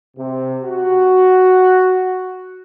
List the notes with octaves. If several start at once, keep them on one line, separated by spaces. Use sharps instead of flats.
C3
F#4